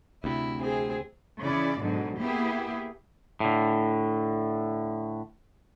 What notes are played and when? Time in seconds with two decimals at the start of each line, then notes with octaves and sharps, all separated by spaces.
0.24 D2 C3 E4
0.62 C4 G#4
1.41 C#3 E3 E4 D5
1.80 G#2 B2 D3 F#3
2.19 A#3 B3 E4 G4 G#4
3.40 A2 D3